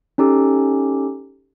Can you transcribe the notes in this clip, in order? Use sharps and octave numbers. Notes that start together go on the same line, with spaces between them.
C#4 D#4 G4 A4